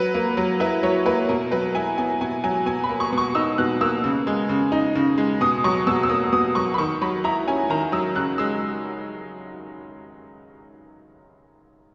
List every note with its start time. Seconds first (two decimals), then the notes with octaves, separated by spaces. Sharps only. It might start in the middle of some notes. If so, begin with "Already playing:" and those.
Already playing: F#3 B4
0.14 A#3
0.37 F#3
0.60 E4 B4
0.83 F#3 C#5
1.06 A#3 B4
1.29 B2 A#4
1.51 F#3 B4
1.75 E4 G#5
1.98 B3 G#5
2.21 B2 G#5
2.44 F#3 G#5
2.66 B2 G#5
2.84 B5
2.89 A#3
3.00 C#6
3.12 B2
3.18 C#6
3.35 D#4 E6
3.58 B2 F#6
3.81 A#3 E6
4.04 C#3
4.27 G#3
4.49 C#3
4.72 D#4
4.95 C#3
5.18 G#3
5.41 B2 D#6
5.64 F#3 C#6
5.87 B2 E6
6.03 E6
6.09 A#3 D#6
6.33 B2 D#6
6.55 F#3 C#6
6.74 B5
6.78 D#3 C#6
7.01 F#3 B5
7.24 E4 A#5
7.48 C#4 G#5
7.70 D#3 A#5
7.92 F#3 E6
8.15 C#3 F#6
8.38 G#3 E6